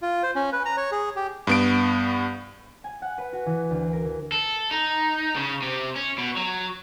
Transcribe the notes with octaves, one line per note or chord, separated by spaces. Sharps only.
F4
C5
C#4
B4
A#5
C#5
G#4
G4
G2 B3 D7
G#5
F#5
B4
F#4
E3
D2
A#4
E3
A4
D#4
C#3
C3
C#4
B2
F#3